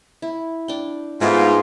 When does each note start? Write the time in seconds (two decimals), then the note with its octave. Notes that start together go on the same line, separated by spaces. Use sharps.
0.22 E4
0.68 D4 G5
1.21 G#2 A3 B3 F4 A4